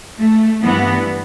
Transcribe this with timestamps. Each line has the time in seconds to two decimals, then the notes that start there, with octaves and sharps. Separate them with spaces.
0.19 A3
0.62 G2 E3 B3